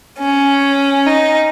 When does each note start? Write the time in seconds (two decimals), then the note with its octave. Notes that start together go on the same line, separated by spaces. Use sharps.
0.19 C#4
1.07 D#4